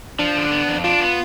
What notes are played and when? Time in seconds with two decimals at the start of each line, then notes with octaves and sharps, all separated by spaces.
0.19 F3 D4
0.36 D3
0.51 B3
0.68 F2
0.84 D4 F4
1.01 B3